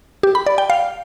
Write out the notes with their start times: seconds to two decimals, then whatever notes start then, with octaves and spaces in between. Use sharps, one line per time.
0.23 G4
0.35 B5
0.47 D5
0.58 G5
0.70 F5